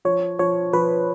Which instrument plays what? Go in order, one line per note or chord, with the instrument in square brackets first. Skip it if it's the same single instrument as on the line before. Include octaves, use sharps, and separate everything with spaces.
[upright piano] F3 [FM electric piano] C#5
[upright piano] F3 [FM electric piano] C#5
[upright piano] F3 [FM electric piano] B4